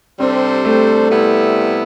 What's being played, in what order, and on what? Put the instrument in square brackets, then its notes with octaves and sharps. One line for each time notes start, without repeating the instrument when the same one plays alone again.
[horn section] C3 G3 D4 A4 C5 [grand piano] C4
[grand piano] A3
[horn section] C3 G3 B3 E4